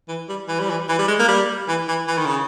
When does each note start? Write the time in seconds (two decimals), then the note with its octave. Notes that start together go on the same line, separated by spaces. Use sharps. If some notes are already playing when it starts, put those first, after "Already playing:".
0.08 E3
0.29 G3
0.48 E3
0.60 G3
0.70 E3
0.89 E3
0.98 G3
1.08 G#3
1.19 A#3
1.28 G3
1.68 E3
1.88 E3
2.08 E3
2.18 D#3
2.26 C#3